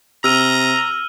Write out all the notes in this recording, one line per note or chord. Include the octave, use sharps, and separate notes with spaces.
C3 A#5 E6 F6 D#7